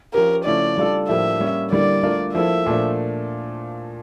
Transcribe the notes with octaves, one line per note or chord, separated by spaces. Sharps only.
F3 C#4 G4 A#4
C#3 F3 A3 C#4 E4 D5
G3 D4 F4 A4
A2 F3 A#3 D4 G4 E5
G3 A#3 C#4
D3 G3 A#3 E4 D5
A3 D4 F4 A#4
F3 A#3 E4 A4 E5
A#2 F3 A3 D4